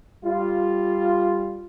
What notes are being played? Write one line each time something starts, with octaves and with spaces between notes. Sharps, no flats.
G3 F4